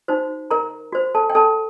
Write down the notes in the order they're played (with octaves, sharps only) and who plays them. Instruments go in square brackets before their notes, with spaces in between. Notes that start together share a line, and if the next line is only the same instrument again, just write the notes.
[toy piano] D#4 F#4 C5
A#4 A#5
F#4 C5
A4 A5
G5
A4 A5